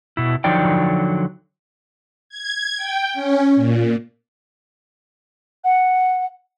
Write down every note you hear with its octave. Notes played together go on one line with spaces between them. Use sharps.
B2 E4
D3 F3 F#3 D#4 D5 G5
G#6
G5
C#4
A#2
F#5